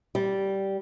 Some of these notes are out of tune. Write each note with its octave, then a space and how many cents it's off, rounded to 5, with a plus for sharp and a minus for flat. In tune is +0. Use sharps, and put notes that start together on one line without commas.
G3 -10